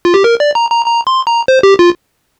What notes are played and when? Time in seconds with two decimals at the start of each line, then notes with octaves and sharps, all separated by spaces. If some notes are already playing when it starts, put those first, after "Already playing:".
0.05 F4
0.14 G4
0.24 A#4
0.40 D5
0.55 A#5
0.71 A#5
0.86 A#5
1.07 C6
1.27 A#5
1.48 C5
1.63 G4
1.79 F4